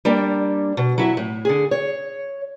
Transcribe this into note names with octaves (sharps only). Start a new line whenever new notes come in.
G3 A#3 D4
B2
F#3 E4 E5
A2
D3 G#4
C#5